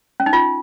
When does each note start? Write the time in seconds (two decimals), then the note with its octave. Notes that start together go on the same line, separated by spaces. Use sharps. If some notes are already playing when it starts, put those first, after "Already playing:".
0.20 C#4
0.26 D#4
0.33 F4